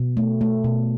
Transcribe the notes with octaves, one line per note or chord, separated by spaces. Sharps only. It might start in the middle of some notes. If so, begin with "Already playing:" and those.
Already playing: B2
A3
A3
B2